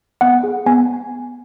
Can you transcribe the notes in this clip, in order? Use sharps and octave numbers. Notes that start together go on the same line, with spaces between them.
B3 F#5
G#4
B3 G#5